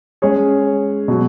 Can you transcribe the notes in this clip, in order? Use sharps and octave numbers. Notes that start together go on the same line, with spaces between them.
G#3 C#4 G#4 C#5
B2 F#3